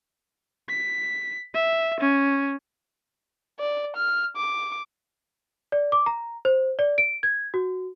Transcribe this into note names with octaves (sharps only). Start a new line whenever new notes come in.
B6
E5
C#4
D5
F6
D6
D5
D6
A#5
C5
D5
D7
G#6
F#4